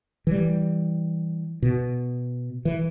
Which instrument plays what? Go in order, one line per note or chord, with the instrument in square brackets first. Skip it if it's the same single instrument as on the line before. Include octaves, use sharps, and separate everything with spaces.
[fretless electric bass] E3 G3
B2
E3